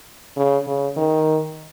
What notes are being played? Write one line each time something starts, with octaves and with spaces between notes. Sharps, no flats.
C#3
C#3
D#3